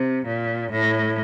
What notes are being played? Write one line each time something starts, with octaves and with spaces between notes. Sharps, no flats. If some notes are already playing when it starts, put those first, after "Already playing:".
Already playing: C3
A#2
A2